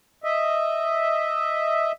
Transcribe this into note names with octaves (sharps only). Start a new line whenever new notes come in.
D#5 E5